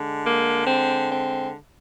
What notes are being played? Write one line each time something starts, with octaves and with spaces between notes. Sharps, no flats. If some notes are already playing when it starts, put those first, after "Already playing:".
Already playing: D3 G#3
A#3
C4
C4